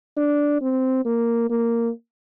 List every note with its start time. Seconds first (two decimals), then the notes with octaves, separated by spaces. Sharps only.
0.17 D4
0.61 C4
1.05 A#3
1.50 A#3